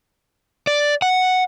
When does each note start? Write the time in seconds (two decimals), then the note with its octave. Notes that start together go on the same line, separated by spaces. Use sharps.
0.67 D5
1.02 F#5